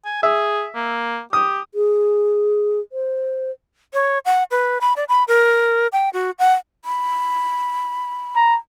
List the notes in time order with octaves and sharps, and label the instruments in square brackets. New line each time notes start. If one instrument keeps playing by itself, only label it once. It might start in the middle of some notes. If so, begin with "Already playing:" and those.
[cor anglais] G#5
[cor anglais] G#4 [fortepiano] E5
[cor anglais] A#3
[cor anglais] G4 [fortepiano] D#6
[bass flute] G#4
C5
[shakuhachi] C#5
F#5
B4
B5
D5
B5
A#4
G5
F#4
F#5
[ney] B5
[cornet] A#5